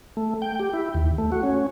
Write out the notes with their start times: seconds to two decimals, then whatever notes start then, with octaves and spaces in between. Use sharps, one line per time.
0.17 A3
0.42 G5
0.60 G4
0.73 E4
0.94 D#2
1.18 A3
1.32 F#4
1.43 C#4